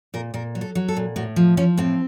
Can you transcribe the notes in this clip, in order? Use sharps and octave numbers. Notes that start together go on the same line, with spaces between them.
A#2 A#4
A#2 A#4
F#3
A4
F#3
A4
A#2
A2 F#4
F3
F3 C#4
A2 C4